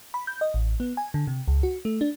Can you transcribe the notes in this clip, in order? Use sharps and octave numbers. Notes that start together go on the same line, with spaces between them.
B5
G6
D#5
A1
B3
G#5
D3
C3
C#2
F#4
A3
D4